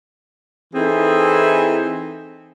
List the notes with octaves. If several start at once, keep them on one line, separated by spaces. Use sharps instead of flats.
E3 C4 D#4 E4 G#4 A4